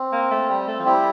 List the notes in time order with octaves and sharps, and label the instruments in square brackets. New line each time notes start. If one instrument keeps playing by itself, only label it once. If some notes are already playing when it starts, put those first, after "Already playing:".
Already playing: [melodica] C4
[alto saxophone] A#3
A3
G3
A3
F3
[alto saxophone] G3 [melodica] E4 G4